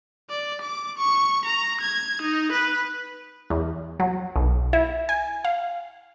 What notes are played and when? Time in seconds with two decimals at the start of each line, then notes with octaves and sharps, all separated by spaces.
0.30 D5
0.61 D6
0.98 C#6
1.45 A#5
1.81 G#6
2.22 D#4
2.52 B4
3.50 E2
4.00 F#3
4.36 B1
4.73 E4
5.09 G#5
5.45 F5